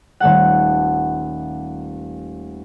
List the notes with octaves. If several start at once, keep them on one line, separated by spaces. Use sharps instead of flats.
D#1 A3 A4 F#5